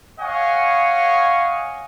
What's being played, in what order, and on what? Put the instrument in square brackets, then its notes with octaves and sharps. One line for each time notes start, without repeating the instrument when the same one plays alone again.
[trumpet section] C#5 D#5 F5 F#5 G#5 C#6